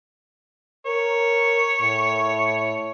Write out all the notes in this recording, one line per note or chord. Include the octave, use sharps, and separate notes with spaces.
A#4 C#5
A2